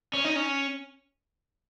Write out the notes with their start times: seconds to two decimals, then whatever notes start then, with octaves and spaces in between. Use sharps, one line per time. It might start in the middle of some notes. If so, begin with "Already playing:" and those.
0.13 C#4
0.24 D#4
0.36 C#4